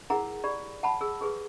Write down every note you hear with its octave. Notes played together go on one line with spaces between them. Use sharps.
E4 G#4 A#4 F#5 A#5
G4 D5 B5
F#5 A5 B5
G#4 E6
G4 G#4 B4